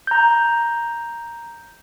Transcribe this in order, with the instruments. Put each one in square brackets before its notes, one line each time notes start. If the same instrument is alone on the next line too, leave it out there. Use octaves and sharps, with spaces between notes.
[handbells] A#5 G6